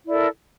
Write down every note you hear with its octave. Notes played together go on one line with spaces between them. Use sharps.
E4 A4 A#4 D5